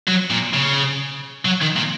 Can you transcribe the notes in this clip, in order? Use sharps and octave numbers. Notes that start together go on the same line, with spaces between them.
F#3
A#2
C#3
F#3
D#3
A#2